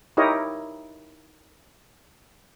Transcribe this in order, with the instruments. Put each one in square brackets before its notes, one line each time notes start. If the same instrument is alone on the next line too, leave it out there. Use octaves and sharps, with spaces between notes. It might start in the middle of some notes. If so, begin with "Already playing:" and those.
[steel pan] D#4 E4 G4 A#4 C#5 D#5